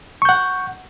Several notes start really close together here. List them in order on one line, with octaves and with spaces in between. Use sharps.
C#6 G6 F#5